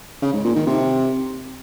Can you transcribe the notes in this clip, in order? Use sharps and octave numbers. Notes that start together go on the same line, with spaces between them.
C#3
G#2
A#2
D#3
C3